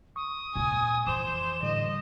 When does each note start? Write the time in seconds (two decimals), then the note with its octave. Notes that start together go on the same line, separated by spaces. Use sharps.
0.16 C#6 D#6
0.56 D#2 A#2 G#5
1.07 F2 E3 C5 D6 E7
1.63 A2 D3 G3 D#5